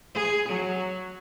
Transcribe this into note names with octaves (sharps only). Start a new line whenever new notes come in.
G#4
F#3